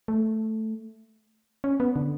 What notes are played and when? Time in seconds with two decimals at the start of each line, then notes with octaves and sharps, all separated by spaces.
0.08 A3
1.64 C#4
1.80 B3
1.96 D3